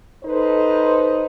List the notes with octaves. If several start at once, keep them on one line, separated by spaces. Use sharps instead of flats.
D#4 A4 B4 C5